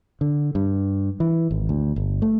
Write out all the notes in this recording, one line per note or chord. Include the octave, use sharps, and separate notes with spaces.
D3
G2
E3
G#1
D2
G1
A3